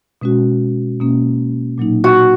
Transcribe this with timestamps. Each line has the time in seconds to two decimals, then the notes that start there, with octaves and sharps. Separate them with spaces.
0.21 B2 G#3 C#4 F#4
1.00 B2 A#3 C#4
1.78 A#2 F#3 A#3 D#4
2.04 F#4